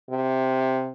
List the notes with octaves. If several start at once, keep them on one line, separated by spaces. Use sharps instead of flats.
C3